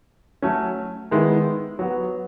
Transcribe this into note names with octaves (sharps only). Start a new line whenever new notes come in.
F#3 A3 C#4
D#3 G#3 B3 E4
F#3 B3 F#4